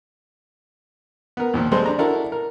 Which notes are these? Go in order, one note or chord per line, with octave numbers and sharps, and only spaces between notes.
B3 A#4
D#2 A#2 F3
G3 G#3 C4 A4 C5
D4 A#5
D4 E4 F#4 A4 A#4
A#4